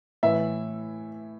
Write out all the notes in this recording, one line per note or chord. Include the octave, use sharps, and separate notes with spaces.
A2 E3 E5